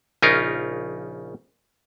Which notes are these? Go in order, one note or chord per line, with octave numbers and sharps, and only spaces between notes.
A#1 C#3 C#4 D#4 F4 A#4